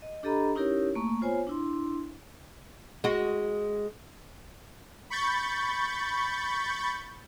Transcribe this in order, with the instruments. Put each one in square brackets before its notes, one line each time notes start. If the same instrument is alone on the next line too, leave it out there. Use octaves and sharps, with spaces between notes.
[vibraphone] D#5
D4 G4 A4 D#5 A#5 B5
C#4 D#4 E4 G4 A#4 C#5
A3 A#3 C#6
B3 F4 C5 C#5 G#5
D4 E4 C6
[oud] G#3 F#4
[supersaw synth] B5 C#6 G6 A6